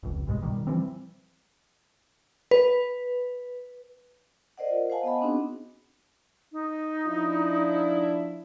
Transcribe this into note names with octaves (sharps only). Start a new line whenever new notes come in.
F1 C#2
B1 G2 B2 G#3
B2 D#3 G3
E3 F3 G3 C4
B4
A#4 C5 D5 D#5 F#5
F4
C5 D#5 F5 F#5 G#5 A5
B3 D#5 F#5 B5
B3 C4 D4 D#4 F#4 G#4
D#4
F3 D4 E4